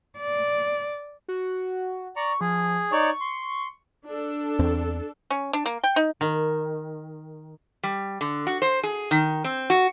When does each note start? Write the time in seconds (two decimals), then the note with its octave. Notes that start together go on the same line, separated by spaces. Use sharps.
0.18 D5
1.28 F#4
2.16 D5 A#5 C#6
2.41 F3 G#4
2.92 D#4 C#5 D5 C#6
3.21 C6
4.06 D4 A4
4.59 E2 C4
5.30 C#4
5.53 D4
5.66 A#3
5.84 G5
5.96 D#4
6.21 D#3
7.83 G3
8.21 D3
8.47 F#4
8.62 C5
8.83 G#4
9.11 D#3
9.45 C4
9.70 F#4